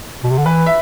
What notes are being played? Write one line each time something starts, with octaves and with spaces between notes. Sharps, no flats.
B2
C3
D3
E3 B4
E5